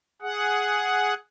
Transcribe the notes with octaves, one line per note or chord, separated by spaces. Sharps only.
G#4 F#5